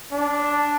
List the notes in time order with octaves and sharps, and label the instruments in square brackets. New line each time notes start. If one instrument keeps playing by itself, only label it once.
[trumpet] D4